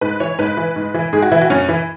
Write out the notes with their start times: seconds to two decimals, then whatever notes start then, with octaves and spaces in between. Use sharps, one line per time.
0.01 G#2 B4
0.20 E3 C#5
0.39 G#2 B4
0.57 E3
0.76 G#2
0.94 E3
1.13 G#2 G#4
1.22 F#4
1.32 E3 E4
1.41 F#4
1.50 F#2 C#4
1.69 E3